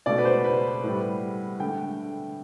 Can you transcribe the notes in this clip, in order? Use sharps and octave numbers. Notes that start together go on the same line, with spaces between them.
B2 A3 D5
B4
C5
B4
A2 G3
D3 A3 G5